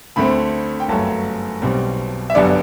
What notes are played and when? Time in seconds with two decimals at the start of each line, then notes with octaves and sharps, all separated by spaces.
0.16 D2 D3 A3 C4 B5
0.80 G5
0.88 G1 F#2 F#3 A3 A5
1.62 B1 B2 G3 C4
2.30 E5
2.35 G1 F#2 D3 G3 B3 D5